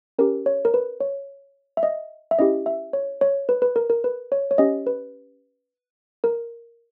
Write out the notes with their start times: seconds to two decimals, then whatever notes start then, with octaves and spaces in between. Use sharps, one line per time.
0.19 C#4 G4 A#4
0.46 C#5
0.65 A#4
0.74 B4
1.00 C#5
1.77 E5
1.83 D#5
2.31 E5
2.39 C#4 E4 G4 D#5
2.66 E5
2.93 C#5
3.21 C#5
3.49 B4
3.62 B4
3.76 A#4
3.90 A#4
4.04 B4
4.32 C#5
4.51 C#5
4.58 C#4 G4 D#5
4.87 B4
6.24 A#4